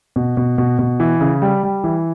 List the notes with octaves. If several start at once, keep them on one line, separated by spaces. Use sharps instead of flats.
B2
B2
B2
B2
E3
C#3
G3
G3
E3